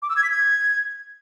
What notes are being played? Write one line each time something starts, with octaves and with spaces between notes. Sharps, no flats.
D6
E6
G#6
B6
G#6